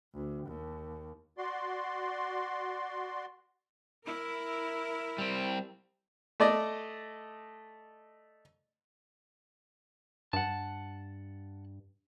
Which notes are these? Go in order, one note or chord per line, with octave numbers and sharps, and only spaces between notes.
D2
D#2
F#4 D5 C6
E4 A#4
G3 C4
A3 D5 D#5
G2 F#5 A5